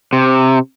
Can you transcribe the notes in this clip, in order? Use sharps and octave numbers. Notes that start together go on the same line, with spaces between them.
C3